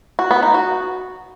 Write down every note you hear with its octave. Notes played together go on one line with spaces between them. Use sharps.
F#4
B3
D#4
F#4